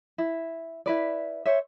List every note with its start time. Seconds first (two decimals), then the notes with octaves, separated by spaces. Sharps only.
0.18 E4
0.86 E4 B4 D5
1.45 C5 C#5 E5